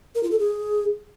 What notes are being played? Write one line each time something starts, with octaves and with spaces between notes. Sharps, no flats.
A#4
F4
A4
G#4